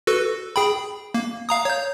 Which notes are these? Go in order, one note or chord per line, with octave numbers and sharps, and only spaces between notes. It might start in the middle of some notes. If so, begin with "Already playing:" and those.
F#4 A4 B4
G#4 G5 B5
A#3
F5 A#5 D#6
C#5 G6